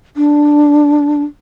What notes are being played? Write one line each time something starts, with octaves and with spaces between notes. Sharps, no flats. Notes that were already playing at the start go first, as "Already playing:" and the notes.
D4